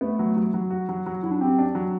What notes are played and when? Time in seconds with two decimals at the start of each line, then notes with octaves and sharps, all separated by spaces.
0.01 A3 B3
0.19 F#3
0.37 F#3
0.54 F#3
0.70 F#4
0.89 F#3
1.06 F#3
1.22 F#3 E4
1.31 D4
1.41 C4 G4
1.59 D4
1.75 F#3